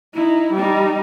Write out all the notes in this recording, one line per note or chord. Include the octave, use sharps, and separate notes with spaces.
D#4 E4
G3 D#4